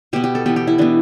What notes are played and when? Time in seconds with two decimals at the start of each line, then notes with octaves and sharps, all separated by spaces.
0.13 B2 B3 G4
0.24 G4
0.35 A4
0.46 E3 B3 G4
0.56 G4
0.67 E4
0.78 E3 B3 D4